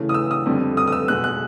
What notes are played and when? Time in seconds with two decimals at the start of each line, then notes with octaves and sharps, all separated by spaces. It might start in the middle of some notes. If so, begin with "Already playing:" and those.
Already playing: C#3 E3 A3
0.09 D#6
0.14 E6
0.31 D#6
0.46 F2 D3 G3
0.77 D#6
0.87 D#6
0.92 E6
1.08 B2 G#3 B3 F#6
1.24 F#6